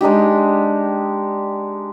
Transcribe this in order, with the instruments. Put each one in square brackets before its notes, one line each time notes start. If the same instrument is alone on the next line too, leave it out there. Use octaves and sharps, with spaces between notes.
[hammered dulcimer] G#3 D4 D#4 G4